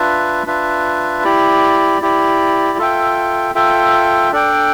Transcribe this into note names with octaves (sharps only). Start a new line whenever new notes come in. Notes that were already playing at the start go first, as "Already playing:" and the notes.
Already playing: D4 F4 B4 E5
D4 F4 B4 E5
E4 G4 D5
E4 G4 D5
F4 A4 E5 G5
F4 A4 E5 G5
D4 A4 D5 G5